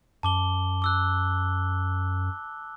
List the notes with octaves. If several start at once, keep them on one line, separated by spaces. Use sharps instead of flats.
F#2 A5 D6 G7
D6 E6 F#6